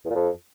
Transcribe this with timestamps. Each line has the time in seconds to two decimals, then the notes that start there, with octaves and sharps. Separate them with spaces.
0.05 E2
0.10 A#2
0.15 F2